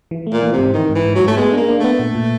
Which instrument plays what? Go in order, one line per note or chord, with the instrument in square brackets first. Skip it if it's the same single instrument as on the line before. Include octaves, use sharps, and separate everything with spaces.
[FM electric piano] E3
A3
[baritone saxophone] A#2
[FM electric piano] E3
[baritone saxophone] C3
[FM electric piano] G#2
[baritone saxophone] D#3 [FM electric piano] E3
[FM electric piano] G#2
[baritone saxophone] E3
[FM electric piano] G#2
[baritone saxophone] F#3
[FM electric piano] G#2
[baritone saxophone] A3
[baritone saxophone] G#3 [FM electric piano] B3
[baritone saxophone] A#3 [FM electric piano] D4
[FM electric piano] D4
[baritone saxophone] A3
[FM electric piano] B3
A#2
A#2